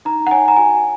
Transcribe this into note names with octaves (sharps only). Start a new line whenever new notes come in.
D#4 A#5
F#5
C#5 G#5
A#5
F#4 G#5